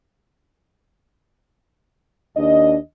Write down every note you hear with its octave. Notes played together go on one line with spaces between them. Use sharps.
D#2 D4 D#5